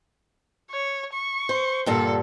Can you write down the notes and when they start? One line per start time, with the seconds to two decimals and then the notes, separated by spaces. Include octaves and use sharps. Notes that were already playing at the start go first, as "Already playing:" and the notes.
0.71 C#5
1.13 C#6
1.49 C5
1.86 G2 A#2 D3 A4